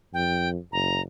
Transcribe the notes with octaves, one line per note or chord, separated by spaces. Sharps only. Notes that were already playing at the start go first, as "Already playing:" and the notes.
F2 G5
F#1 A#5